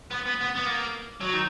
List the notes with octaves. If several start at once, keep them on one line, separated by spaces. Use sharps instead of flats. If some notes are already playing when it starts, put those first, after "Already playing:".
B3
B3
B3
B3
A#3
F#3
D#3